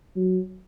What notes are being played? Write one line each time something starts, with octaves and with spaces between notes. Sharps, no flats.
F#3